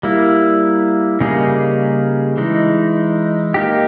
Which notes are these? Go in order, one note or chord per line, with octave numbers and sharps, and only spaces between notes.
G3 A#3 E4
C#3 G3 A#3 D#4 G#4
E3 G#3 D#4
A#3 D#4 G4